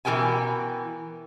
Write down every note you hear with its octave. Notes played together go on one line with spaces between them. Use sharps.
B2 E3 A4 A#4 G5 G#5